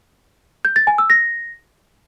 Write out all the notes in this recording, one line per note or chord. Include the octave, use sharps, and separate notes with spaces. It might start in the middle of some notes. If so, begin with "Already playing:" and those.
G6
A6
G#5
E6
A#6